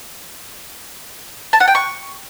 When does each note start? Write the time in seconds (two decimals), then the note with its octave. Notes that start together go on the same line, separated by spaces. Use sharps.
1.53 A5
1.60 F#5
1.68 G5
1.75 C#6